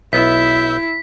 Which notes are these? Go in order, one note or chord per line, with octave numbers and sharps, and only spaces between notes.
B1 B3 E4 E5 G6 B6